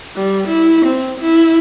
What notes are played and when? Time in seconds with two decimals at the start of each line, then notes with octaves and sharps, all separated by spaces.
0.15 G3
0.48 E4
0.85 C4
1.20 E4